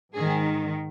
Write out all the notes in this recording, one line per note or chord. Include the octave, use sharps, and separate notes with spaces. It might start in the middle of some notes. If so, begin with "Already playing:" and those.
G#2 D#3 G#4